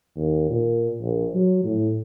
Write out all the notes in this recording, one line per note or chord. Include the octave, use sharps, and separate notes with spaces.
D#2
A#2
A#1
F#3
A2